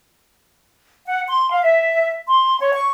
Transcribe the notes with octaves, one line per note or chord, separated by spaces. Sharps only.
F#5
C6
F5
E5
C6
C#5
C#6